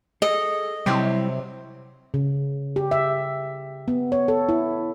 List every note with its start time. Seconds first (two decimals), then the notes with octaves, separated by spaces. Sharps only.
0.22 G#4 A4 D#5
0.86 C3 F#3 G3 C4 E4 G4
2.14 C#3
2.76 G4
2.91 E5
3.88 B3
4.12 C#5
4.28 A4
4.49 E4